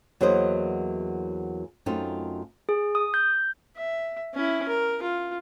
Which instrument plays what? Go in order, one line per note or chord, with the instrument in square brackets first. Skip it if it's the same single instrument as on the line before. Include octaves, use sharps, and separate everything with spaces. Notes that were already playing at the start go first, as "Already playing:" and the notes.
[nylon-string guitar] E2 F#3 A#3 E4 C5 D#5
F#2 A3 C4 D#4 F4
[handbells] G#4
D#6
G6
[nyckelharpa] E5
C#4 E4
A#4
F4